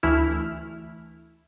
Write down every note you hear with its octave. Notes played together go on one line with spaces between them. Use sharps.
D2 E3 A3 E4 F6